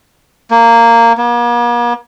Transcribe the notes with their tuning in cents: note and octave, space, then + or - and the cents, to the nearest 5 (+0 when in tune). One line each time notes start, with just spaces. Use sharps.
A#3 -10
A#3 +45